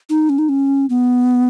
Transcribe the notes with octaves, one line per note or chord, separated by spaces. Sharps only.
D#4
C#4
D#4
C#4
B3